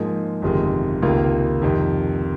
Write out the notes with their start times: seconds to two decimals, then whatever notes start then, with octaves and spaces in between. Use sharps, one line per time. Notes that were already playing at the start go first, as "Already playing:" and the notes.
Already playing: G#2 F3 A#3 D#4
0.42 G1 F2 C3 D#3 G#3
1.02 C#2 C3 D#3 A#3 F4
1.62 F2 C3 D#3